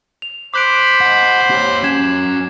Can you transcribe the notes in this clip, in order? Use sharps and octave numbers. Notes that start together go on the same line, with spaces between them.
F7
C5 B5 D6 F#6 D7
D#5 F#5
G4 C#5
C#4 F#4 G#6 E7